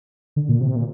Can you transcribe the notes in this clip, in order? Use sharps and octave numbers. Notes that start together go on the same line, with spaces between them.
D3
A#2
C3
A#2